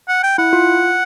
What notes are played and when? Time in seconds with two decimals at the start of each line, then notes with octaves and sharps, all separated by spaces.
0.08 F#5
0.23 G5
0.38 E4 F#5
0.53 F4